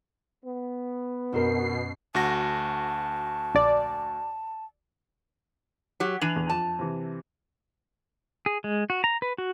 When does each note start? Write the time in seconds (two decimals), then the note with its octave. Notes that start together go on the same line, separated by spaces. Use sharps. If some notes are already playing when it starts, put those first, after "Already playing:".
0.43 B3
1.32 F#2 B2 D4 A#4 C5 C7
2.15 D2 F#4 A5 A#6
3.55 A#1 D5
6.00 F#3 G4
6.21 E3 D4 D#7 F7 F#7
6.36 E2
6.50 F2 A5
6.79 C3 E3
8.46 G#4
8.64 G#3
8.90 F#4
9.04 A#5
9.22 B4
9.38 F#4